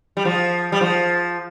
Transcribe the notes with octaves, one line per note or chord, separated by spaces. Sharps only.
G3
F3
G3
F3